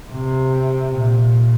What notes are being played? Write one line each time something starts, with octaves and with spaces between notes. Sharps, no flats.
C3
A#2